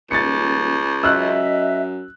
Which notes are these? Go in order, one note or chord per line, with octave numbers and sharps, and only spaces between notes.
D#1 C#2 A6 C#7
F#2 D#5 E5 E6 F#6